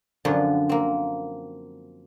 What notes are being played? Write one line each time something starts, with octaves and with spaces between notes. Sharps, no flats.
F#2 D3 F3
A#3 C4